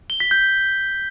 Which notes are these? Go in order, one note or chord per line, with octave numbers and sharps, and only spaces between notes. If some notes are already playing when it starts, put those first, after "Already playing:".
G7
B6
G6